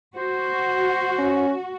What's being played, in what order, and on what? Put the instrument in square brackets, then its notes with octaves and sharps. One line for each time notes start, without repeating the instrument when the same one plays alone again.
[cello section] F#4 [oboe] C5
[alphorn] C#4